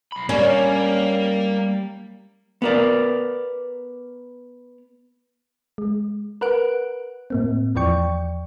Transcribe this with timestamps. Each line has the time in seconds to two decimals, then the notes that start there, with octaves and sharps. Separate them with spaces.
0.12 B1 B5
0.29 G3 A#3 C#4
2.62 B3 A#4 D5
5.78 G#3
6.41 A#4 B4 F#5 F#6 D7
7.30 A2 A#3 C4
7.75 E2 E3 F3 D5 G5 C#6